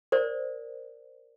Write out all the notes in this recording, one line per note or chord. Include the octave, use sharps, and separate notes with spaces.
A#4 C5 D5